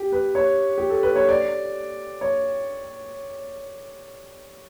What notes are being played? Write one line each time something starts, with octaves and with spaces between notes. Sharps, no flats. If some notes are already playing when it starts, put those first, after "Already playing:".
Already playing: G4
B4
C#5
G4
A4
B4
C#5
D5
C#5